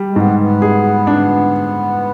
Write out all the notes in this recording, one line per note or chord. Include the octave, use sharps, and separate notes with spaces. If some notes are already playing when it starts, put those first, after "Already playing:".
Already playing: G3
G#3
G#2 B3
B3
G#4
D4